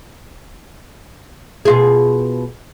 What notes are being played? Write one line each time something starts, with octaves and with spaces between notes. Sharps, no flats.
B2 F4 G#4